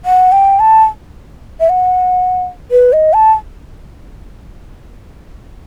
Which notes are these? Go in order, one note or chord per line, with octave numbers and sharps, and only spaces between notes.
F#5
G5
A5
E5
F#5
B4
D#5
A5